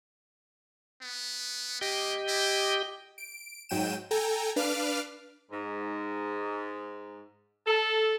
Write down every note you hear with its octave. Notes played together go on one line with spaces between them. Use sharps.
B3
A#3 G4 D#5 G5
E4
D7
G#2 F#3 G5 D#7 E7
A4 G5 G#5 A#5
D4 B4 F5 D6 F6
G#2
A4